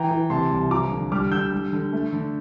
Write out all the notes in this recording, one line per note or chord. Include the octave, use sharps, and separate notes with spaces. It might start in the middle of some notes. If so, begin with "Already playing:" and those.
Already playing: E3 G5 A#5
E3
C3 A5 C6
C2
F3 A#5 D6
D3
G3 D6 F6
D3 E6 G6
G3
D3
A3
D3